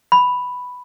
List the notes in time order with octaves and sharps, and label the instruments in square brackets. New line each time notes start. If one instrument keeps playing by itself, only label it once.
[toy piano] B5